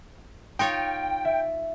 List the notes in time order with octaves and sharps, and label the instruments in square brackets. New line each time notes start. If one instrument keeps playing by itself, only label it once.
[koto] D#4 F4 C#5 [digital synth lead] G5
[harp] E5